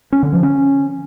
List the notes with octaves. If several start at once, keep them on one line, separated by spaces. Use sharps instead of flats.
C#4
D3
F3
C#4